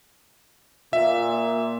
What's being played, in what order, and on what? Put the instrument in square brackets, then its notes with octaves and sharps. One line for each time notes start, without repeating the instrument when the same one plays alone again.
[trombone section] A#2 [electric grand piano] E5